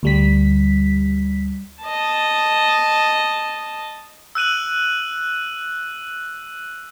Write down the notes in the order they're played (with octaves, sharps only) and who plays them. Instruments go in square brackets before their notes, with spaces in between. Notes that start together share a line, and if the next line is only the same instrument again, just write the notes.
[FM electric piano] D2 G3 B6
[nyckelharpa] D#5 A5
[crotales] E6 F#6 D#7 F#7